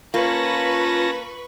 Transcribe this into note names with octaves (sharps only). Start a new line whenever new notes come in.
A#3 C#4 F4 B4 A5 B5 C#6 A#6